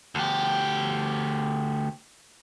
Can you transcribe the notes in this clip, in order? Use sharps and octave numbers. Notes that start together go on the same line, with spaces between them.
D2 G4